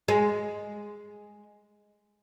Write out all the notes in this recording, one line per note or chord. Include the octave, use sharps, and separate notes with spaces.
G#3